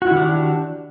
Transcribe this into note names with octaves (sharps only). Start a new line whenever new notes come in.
D#3 D4 E4 F#4 G4